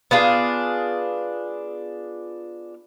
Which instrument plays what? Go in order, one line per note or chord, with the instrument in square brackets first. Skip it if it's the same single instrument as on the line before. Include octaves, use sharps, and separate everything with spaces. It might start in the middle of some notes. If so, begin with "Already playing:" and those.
[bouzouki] B3 D4 F4 G#4